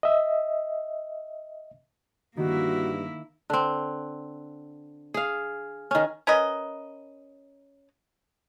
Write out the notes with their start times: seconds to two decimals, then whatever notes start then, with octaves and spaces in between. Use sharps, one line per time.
0.03 D#5 E5
2.37 G2 D#3 A#3 E4 F#4
3.50 D3 C4
5.14 G#4 F5
5.91 D#3 C#4
6.27 C#4 A#4 B4 D#5